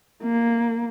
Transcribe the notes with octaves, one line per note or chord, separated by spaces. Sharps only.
A#3